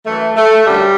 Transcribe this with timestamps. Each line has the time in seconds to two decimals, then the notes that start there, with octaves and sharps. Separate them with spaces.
0.05 F#2 E3 A3
0.36 A3
0.66 F#2 D3 F#3 G3